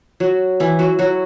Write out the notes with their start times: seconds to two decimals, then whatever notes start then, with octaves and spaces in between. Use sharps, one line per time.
0.20 F#3 F#4
0.60 E3 E4
0.79 F#3 F#4
0.99 F#3 F#4